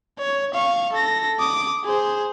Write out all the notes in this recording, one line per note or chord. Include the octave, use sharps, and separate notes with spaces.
C#5
F5 C#6
A4 A#6
D6 D#6
G#4 C5